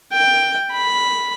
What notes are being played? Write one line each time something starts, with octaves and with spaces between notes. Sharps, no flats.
G5
B5